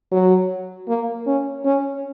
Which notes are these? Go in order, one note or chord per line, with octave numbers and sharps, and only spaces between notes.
F#3
A#3
C#4
C#4